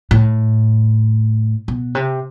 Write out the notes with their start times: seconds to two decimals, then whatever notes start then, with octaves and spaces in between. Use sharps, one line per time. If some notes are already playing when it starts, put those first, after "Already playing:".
0.11 A2
1.68 B2
1.95 C3